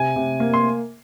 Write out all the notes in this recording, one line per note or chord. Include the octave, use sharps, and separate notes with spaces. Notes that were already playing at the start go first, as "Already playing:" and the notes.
Already playing: C3 G#5
C3
A#3
C6